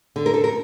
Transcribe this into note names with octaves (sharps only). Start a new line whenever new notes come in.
D3
A#4
A4
A#4